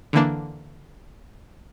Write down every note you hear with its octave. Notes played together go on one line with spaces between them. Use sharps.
D3 E3 A#3 D4